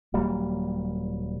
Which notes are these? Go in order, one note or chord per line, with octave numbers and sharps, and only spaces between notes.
D#1 F#3 G3 A#3